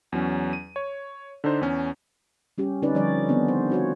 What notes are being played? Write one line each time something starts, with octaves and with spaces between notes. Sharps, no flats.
E2 F#3 C#4
D#7
C#5
D3 D4 D#4 C5
E2 C#4
G3 C#4 G4
D3 C4 C#4 D#4 B4 D5
D3 F3 G3 D4 C#5 D5
D#3 B3 C4 D4
C5
F4 F#4 C#5